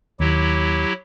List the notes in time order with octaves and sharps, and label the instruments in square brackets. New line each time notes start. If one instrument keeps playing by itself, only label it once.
[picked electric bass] D#2 [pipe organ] F#3 E4 G4